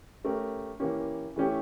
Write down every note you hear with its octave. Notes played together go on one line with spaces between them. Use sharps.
A3 C#4 G4 A#4
E3 A#3 C#4 G4
E3 A3 C#4 G4